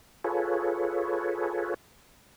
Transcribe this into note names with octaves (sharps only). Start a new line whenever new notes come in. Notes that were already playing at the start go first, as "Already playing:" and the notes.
F4 G#4 A4 B4 C#5